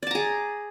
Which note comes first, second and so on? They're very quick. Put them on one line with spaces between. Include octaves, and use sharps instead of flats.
D5 A5 A#5 G#4